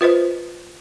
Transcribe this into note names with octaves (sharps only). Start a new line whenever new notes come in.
F4 B4 C5 D#5